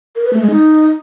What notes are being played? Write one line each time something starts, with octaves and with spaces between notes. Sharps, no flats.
A#4
B4
A3
G#3
D#4